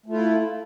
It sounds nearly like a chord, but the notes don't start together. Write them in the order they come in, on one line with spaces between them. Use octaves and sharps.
A3 F4 E4